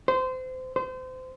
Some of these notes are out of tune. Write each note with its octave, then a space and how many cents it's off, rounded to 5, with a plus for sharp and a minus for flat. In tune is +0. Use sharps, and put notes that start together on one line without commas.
C5 -25
C5 -30